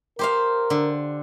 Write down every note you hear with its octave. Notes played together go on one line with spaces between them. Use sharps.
G4 A#4 C5 F5
D3